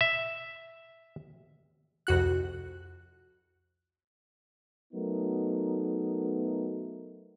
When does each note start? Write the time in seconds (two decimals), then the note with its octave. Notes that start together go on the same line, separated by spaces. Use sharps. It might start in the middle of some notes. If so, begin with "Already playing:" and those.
0.01 E5
2.07 C2 F2 F#4 F#6
4.94 F#3 A3 B3 D#4 A#4